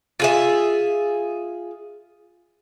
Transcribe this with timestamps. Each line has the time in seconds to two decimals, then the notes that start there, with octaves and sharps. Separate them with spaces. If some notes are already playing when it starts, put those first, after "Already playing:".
0.20 F4 G#4 E5